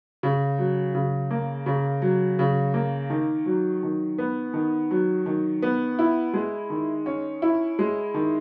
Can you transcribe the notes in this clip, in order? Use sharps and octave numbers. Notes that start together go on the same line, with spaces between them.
C#3
F#3
C#3
A#3
C#3
F#3
C#3
A#3
D#3
F#3
D#3
B3
D#3
F#3
D#3
B3
E4
G#3
D#3
C#4
E4
G#3
D#3